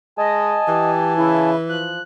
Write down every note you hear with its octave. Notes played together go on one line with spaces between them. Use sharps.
G#3 D#5 G#5 A5
E3 G4
C#3 E4
F3 F#6